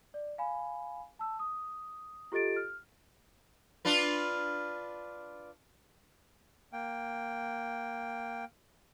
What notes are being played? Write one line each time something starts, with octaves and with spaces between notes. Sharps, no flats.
D5
F5 G#5 B5
A5 E6
D#6
F4 G4 A4 D#5 A6 D7
F6
D4 F4 B4
A#3 G5